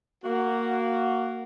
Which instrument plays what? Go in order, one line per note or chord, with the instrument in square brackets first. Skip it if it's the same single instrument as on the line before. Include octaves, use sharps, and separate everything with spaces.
[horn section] A#3 F#4